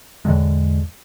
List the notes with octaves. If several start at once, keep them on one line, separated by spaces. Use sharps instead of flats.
E2 A2 D3 G#3